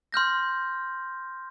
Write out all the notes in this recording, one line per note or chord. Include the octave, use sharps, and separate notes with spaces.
C6 F6 G6 A#6